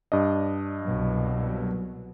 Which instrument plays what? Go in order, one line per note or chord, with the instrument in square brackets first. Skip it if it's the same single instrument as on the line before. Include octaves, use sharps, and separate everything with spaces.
[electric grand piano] G2 D4 D#5
[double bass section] C2 B2 F#3